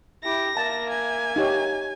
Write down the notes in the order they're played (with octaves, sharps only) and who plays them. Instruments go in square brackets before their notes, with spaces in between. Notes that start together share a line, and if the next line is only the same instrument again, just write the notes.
[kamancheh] E4 G4 [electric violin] A#6
[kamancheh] A#3 E5 [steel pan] A5
[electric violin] G#5
[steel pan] D#4 G4 C#5